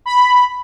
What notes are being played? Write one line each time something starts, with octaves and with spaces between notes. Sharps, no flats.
B5